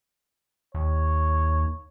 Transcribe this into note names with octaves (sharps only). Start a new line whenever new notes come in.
D#2 C#5